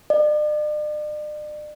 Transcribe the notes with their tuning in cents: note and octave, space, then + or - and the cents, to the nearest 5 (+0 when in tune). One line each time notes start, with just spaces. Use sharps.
D5 +45